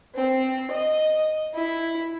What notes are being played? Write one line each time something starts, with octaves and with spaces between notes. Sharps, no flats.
C4
D#5
E4